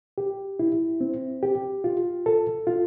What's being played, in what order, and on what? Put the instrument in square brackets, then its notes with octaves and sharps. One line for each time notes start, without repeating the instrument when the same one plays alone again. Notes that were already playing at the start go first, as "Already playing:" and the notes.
[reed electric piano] G4
E4
C4
G4
F4
A4
F4